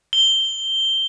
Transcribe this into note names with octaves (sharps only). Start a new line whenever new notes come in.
G7